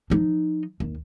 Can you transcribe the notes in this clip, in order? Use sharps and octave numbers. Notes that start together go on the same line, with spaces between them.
F3 D#4
D#2